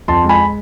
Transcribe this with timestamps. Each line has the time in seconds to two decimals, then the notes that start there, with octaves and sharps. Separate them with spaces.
0.08 F2 A5 C6
0.24 G#3
0.29 G#5 B5